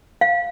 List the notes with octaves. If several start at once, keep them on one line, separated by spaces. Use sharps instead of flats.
F5